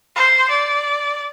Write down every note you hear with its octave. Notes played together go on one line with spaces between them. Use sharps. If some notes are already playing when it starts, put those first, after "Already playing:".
C5
D5